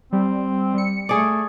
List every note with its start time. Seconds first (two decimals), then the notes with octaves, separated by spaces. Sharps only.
0.13 G3 C4
0.74 G3 C#7
1.09 A3 G#4 D5